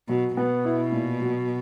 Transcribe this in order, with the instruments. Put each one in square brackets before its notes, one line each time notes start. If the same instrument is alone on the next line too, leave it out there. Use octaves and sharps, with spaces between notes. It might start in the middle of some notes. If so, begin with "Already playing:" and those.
[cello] B2 [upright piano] F#3
[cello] B2 [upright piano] B3
[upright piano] E4
A#2
F#3